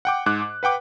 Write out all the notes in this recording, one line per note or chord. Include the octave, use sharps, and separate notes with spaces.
F#5 G5 D6
G#2 D6 F#6
D6
B4 F#5 G5 D6